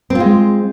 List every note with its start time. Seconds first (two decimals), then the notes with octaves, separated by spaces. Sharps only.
0.10 C4
0.15 F4
0.20 G#3